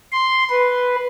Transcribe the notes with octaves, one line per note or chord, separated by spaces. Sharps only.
C6
B4